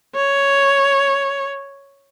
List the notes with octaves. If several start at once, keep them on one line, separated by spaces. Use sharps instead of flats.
C#5